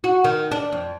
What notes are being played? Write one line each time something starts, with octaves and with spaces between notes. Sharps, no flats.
F#4
D#3
D4
F2